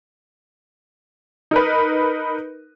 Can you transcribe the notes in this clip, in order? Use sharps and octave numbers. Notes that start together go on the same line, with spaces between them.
D#4 A#4 B4